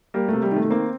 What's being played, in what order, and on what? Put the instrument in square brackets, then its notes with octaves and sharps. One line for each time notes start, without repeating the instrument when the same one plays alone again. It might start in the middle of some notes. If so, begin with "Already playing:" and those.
[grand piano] G3 [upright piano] A#3
[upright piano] C3 [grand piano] A3
[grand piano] G3
[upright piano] D#3 [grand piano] A3
[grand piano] A3
[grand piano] A#3 [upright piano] C4